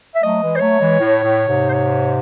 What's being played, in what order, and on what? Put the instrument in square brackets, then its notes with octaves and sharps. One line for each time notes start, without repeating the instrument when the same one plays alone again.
[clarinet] E5
[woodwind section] F#3 A3 [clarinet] D#5
[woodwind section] E3 G#3
[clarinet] C5
[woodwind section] F#3 A3 [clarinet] C#5
[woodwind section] E3 G#3
A2
A2
G#2 C3
[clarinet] C5
C#5